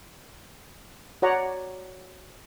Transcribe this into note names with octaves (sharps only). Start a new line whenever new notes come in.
F#4 C#5 D5 F#5 A#5